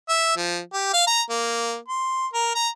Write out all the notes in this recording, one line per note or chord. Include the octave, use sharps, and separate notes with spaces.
E5
F3
G4
F5
A#5
A#3
C6
A#4
A#5